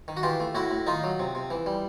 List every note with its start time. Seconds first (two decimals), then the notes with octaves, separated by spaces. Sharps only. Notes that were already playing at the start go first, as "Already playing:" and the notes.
0.08 D#3
0.17 F#4
0.23 E3 F4 G4
0.40 A3
0.55 A2 E4 F#4
0.71 A2
0.87 D#3 D#4 F4
1.04 F#3
1.19 C3
1.35 C3
1.51 E3
1.66 G3